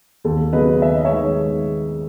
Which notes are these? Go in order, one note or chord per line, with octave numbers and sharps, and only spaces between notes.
D#2 A4
C#3 F#3 B3 B4 D#5
D#2 E5
D#5
C#5 E5
D#3 G#3